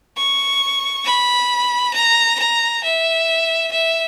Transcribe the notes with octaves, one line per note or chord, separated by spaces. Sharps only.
C#6
B5
A#5
A#5
E5
E5